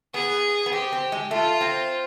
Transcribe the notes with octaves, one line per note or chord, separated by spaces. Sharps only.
B3 G#4
B3
C4 G4
C4
G#3
A3 F4
C4